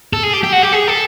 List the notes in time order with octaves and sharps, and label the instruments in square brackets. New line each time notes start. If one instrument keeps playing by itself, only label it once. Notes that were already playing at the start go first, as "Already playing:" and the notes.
[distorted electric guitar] A4
G#4
G4
G4
F#4
G4
G#4
A4